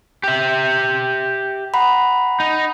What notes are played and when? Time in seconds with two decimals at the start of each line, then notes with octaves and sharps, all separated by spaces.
0.24 G4 E5
1.74 F#5 A#5 B5
2.40 D#4